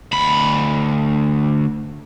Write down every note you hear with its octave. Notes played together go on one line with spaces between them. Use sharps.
D2 B5